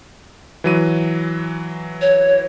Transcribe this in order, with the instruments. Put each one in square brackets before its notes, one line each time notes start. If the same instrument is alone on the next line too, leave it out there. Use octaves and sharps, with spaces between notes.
[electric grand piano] E3 F#3 D#7
[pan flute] C#5